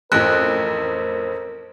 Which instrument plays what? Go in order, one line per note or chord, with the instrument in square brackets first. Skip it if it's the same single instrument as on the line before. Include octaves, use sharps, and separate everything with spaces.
[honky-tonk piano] A1 F2 [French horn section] A#4 C5 [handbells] F#6